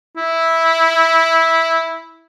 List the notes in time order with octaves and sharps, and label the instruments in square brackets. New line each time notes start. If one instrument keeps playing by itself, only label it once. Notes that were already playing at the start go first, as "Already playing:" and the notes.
[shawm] E4